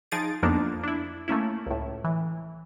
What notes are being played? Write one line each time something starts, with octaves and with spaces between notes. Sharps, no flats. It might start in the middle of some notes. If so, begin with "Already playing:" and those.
F3 D#4 G#4 A6 D7
F2 F3 A#3 B3 D4 D#4
D4 E4
A3 A#3 C#4 E4
C#2 A2
E3